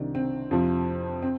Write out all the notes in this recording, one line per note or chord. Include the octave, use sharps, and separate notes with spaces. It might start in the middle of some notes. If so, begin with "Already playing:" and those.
Already playing: C2 C3 D#3 D4
C4
F2 C3 F3
C4